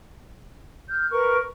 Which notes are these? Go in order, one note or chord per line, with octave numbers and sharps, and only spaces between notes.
F6 G6
A#4 B4 C#6